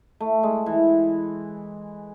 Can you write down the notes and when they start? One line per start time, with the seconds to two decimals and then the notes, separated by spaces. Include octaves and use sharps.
0.20 A3
0.43 G#3
0.66 E3